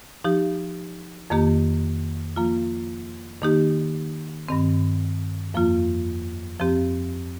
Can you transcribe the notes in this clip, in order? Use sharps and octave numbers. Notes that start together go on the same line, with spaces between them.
F3 D#4 G4
F2 D#3 A#3 G4
F3 A#3 F4
D#3 A#3 D#4 G4
G2 D#3 C4
F2 F3 A#3 F4
F2 F3 C4 G4